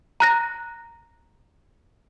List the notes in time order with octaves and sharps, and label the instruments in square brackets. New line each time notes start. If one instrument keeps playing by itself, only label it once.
[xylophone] A#5 F#6 A#6